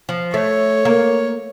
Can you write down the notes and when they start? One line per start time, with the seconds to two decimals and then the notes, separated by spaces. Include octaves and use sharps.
0.09 F3
0.34 A3 C#5
0.85 A#3